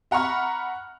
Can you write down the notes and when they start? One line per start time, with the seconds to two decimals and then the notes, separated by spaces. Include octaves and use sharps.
0.11 E5 F#5 A#5 B5 C#6 F6